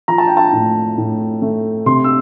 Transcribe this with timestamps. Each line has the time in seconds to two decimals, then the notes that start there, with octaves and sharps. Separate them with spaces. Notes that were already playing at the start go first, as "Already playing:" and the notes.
0.08 F3 A#5
0.18 A5
0.27 G5
0.37 A5
0.52 A2
0.98 A2
1.42 A3
1.86 C3 C6
2.04 E6